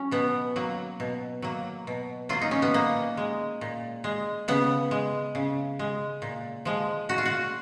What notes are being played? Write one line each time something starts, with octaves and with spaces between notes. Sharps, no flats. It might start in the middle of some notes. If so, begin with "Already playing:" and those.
Already playing: F#3 C#4
B2 B3
F#3 A#3
B2
F#3 A#3
B2
F#3 A#3 F4
D#4
C#4
B3
A#2 A#3
G#3
A#2
G#3
C#3 B3
G#3
C#3
G#3
A#2
F3 G#3
A#2 F#4
F4
F#4